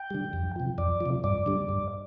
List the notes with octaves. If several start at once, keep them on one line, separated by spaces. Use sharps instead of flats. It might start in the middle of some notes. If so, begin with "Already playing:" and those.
Already playing: G5
D3 G3
F2
C3 F3
F2 D5
F3
C3
G2 D5
D3 G3
G2